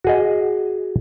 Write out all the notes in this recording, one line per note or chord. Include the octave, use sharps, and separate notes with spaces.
F#4 G#4 D#5